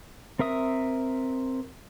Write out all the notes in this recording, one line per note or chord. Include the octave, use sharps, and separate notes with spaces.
C4 A#4 E5 D#6